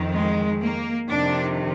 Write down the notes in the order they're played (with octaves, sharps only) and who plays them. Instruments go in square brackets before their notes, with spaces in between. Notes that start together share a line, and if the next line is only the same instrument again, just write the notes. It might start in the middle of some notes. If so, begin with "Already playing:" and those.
Already playing: [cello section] F2 D#3
G#3
A#3
F2 C3 D#3 D4